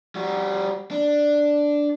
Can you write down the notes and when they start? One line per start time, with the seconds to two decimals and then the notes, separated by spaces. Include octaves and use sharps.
0.15 G3 F#4
0.91 D4